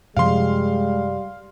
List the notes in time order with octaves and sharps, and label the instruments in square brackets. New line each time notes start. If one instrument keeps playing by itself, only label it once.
[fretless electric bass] F#2 C3 F3 [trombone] G3 [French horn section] G#3 [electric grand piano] F5 C6